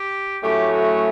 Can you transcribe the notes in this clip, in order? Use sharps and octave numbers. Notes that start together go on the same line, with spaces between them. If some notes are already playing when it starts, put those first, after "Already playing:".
Already playing: G4
A2 F#3 A3 C#4 G4
F#4